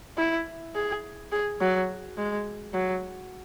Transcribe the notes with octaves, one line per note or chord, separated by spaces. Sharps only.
E4
G#4
G#4
F#3
G#3
F#3